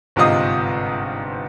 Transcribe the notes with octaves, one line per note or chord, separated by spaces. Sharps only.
G1 G#2 C3 F4 D#5 D#6